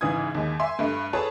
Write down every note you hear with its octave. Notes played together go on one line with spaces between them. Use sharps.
A1 G#2 C#3 E3 D#6 G#6
D#2 G#3
E5 G#5 C6
G2 A3
G#4 A4 B4 C#5 A5